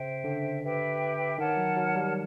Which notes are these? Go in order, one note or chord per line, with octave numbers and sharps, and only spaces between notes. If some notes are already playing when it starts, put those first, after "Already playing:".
Already playing: C#3 C5 E5 G5
D3
G4 B4 E5 G5
D#3 A#4 C#5 F#5 A5
F#3
F#3
G3